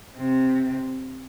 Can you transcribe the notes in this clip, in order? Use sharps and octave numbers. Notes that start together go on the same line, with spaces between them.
C3